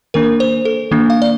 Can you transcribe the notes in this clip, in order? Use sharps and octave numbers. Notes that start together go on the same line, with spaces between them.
D#3 A#3 D4 A#4
C5
A4
D#3 A#3 D4
F5
D5